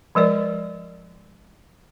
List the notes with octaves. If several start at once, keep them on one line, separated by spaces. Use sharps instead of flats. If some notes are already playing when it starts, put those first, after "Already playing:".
F3 G#3 A#4 D5